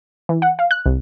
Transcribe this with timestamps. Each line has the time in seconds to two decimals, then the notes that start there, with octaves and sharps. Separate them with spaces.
0.29 E3
0.42 F#5
0.59 F5
0.71 F#6
0.86 C2